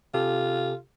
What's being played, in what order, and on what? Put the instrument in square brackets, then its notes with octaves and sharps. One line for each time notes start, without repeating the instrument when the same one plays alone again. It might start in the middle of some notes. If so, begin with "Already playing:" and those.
[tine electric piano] C3 G4 A4 [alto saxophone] F4